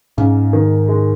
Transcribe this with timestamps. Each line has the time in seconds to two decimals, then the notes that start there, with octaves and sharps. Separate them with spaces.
0.18 G#2 C#3
0.53 D#3
0.88 G#3